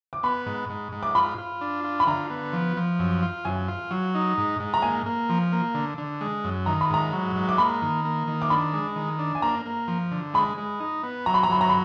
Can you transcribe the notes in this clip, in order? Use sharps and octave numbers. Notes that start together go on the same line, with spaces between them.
D6
B3 B5
G#2
G#2
G#2
D6
F4 B5
F4
D4
F4
B5
D3 A#5
B3
F3
F3
F#2
F4
F#2 G#5
F4
F#3
D#4
G#2
G#2
A#5
A#3 G#5
A#3
F3
A#3
D3
D3
G#3
F#2
D#3 A#5
B5
G#2 A#5
F#3
G#2
D6
A#3 B5
D#3
A#3
D#3
D6
D4 B5
G#3
D#3
D4
G#5
A#3 A#5
A#3
F3
D3
G#3 B5
G#3
D#4
B3
F#3 A#5
B5
A#5
F#3 B5
A#5
B5